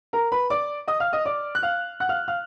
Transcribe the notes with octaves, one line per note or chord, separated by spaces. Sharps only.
A#4 A#5
B4 B5
D5 D6
D#5 D#6
F5 F6
D#5 D#6
D5 D6
F#6
F5 F6
F#5 F#6
F5 F6
F5 F6